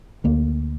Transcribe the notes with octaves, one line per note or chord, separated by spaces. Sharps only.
D2 D3 A#3